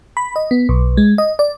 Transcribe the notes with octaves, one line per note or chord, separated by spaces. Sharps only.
B5
D#5
B3
B1
G#3
D#5
D5